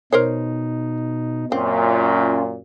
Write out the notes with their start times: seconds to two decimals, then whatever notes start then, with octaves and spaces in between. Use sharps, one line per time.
0.13 B2 D#4 A#4 C5 C#5
1.52 F#2 A#2 C4 C#4 F4